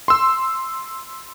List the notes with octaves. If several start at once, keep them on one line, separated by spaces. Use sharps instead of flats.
C6 E6